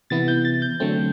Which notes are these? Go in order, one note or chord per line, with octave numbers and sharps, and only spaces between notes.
C3 E3 B3 E4 A6
G6
A6
G6
D3 F#3 A3 C4